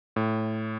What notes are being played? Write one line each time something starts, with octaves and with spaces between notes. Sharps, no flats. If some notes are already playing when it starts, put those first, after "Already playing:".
A2